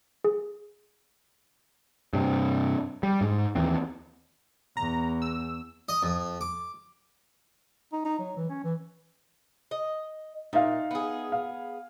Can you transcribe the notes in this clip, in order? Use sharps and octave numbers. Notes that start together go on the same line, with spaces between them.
G#4
G2 C3
G3
G#2
D#2 E3 C4
E2 A#5
E6
D#5
F2
D6
D#4
D#4
F#3
E3
C#4
E3
D#5
A#2 D#4 E5 F5
B3 G#4
F5